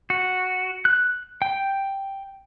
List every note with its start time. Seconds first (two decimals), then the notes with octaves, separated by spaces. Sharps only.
0.10 F#4
0.85 F#6
1.42 G5